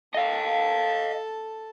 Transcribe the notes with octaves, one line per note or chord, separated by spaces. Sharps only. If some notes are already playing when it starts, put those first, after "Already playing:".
A4 D#5 F5 A5